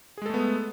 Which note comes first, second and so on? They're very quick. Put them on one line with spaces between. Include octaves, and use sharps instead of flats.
G#4 G#3 A4 A3 B3